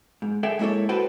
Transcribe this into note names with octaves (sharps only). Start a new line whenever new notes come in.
G#2
G#4 A4 E5 G5
G#3 A#3 E4 A4 C#5
F#4 A4 B4 C5 G5